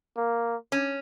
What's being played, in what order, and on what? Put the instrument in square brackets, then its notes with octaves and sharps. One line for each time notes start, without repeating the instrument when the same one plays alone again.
[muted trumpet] A#3
[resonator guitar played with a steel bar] C#4